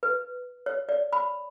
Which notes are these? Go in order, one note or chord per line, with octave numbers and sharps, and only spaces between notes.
B4
C#5
D5
B5